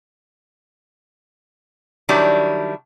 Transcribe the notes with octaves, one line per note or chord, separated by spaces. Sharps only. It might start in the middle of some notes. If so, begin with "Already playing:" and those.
D#3 F#3 G3 D4 E4